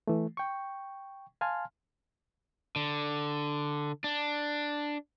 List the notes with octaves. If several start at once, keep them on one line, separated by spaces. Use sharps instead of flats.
E3 A3
G5 C#6
F5 G#5 A5 C6 F6
D3
D4